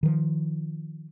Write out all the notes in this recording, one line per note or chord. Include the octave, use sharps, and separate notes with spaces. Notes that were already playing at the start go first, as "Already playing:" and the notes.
D#3 F3